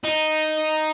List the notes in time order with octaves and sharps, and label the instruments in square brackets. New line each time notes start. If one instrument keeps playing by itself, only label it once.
[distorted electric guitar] D#4